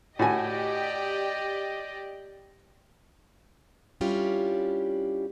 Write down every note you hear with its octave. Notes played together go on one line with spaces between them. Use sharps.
A2 F#4 G4 D5 D#5 G#5
G3 C#4 D4 E4 F4 G4